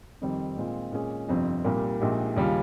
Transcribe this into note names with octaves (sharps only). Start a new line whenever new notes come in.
F2 C3 D#3 G3 C4
A#2 G#3 C4 F4
A#2 G#3 C#4 G#4
G1 F2 C3 F3 C4
C2 A#2 G3 A#3
A#1 A#2 G#3 D#4 G4
D#2 C#3 G3 C#4 F4